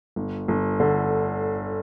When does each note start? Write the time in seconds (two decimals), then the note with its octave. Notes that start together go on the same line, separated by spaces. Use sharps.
0.16 G1
0.48 G1
0.80 D3